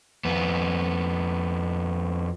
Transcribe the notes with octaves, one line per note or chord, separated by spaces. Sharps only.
F2 B3